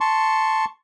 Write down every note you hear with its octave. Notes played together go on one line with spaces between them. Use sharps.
A5 C6 C#6